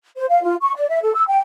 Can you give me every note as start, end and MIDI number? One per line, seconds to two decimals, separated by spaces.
0.16 0.25 72
0.29 0.40 77
0.43 0.55 65
0.61 0.74 85
0.75 0.87 74
0.89 1.00 76
1.02 1.14 69
1.14 1.24 88
1.28 1.41 79